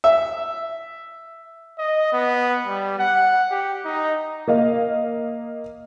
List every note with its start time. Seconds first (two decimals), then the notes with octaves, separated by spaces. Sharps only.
0.04 E5
1.78 D#5
2.13 B3
2.66 G3
2.99 F#5
3.51 G4
3.85 D#4
4.48 A#3 D#5 F5